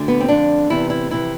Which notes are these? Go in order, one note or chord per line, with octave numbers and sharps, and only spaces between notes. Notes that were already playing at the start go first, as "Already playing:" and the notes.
Already playing: D2 D3
B3
C4
F2 D3 D4
E2 C3 E3 E4
E4
F2 C3 E3 E4